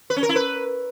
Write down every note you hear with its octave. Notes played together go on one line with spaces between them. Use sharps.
B4
C#4
A#4
E4
B4